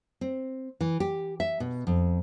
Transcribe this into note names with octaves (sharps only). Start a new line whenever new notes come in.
C4
E3
G4
E5
B2
F2